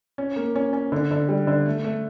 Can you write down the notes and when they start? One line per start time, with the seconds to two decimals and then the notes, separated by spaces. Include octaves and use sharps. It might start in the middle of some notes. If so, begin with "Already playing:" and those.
0.18 C#4
0.36 A#3
0.56 C#4
0.73 C#4
0.92 D3
1.11 D3
1.29 G3
1.47 D3
1.66 A3
1.84 A3